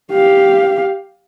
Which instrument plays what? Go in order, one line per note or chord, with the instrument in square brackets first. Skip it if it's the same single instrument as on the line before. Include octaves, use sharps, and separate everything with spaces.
[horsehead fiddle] G4 F5